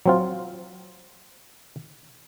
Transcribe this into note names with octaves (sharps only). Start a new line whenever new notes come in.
F#3 C4 F4